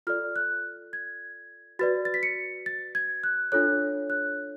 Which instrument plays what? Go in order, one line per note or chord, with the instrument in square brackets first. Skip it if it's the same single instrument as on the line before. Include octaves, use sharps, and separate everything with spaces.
[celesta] F4 A4 D5 F6
F#6
G#6
F#4 B4 D5 A6
A6
B6
C#7
A6
G#6
F#6
D4 F4 A4 C#5 F#6
F#6